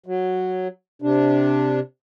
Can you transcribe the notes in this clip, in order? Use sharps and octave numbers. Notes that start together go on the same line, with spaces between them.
F#3
C3 D4